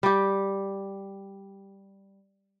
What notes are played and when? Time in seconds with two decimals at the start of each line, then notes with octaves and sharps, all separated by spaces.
0.03 G3 G4